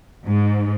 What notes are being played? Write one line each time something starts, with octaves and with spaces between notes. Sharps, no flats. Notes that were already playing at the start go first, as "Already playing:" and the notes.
G#2